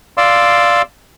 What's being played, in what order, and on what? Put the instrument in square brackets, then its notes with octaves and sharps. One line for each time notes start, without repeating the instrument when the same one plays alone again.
[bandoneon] D5 F5 C6 D6 E6